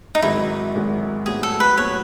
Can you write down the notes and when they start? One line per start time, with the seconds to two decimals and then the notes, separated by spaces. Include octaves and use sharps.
0.15 D#4
0.22 G#1 G#2 D#3 F#3 E4
0.75 G#1 G#2 D#3 F#3
1.26 A2 F#3 B3 G#4
1.43 A4
1.60 B4
1.77 A2 F#3 B3 C#5